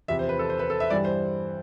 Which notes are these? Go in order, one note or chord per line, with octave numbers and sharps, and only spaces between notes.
E2 C3 F3 E5
C5
B4
A4
C5
B4
A4
E5
G2 E3 G3 D5
C5